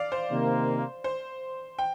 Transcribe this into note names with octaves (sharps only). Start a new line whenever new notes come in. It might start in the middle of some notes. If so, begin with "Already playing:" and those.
Already playing: D5 F5
C5
C3 D#3 A#3
C5
G5